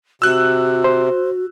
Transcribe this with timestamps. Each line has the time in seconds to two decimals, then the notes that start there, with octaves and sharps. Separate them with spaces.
0.22 C3 F#4 E6 F#6
0.84 C5